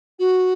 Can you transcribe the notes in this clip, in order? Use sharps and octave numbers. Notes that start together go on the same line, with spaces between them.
F#4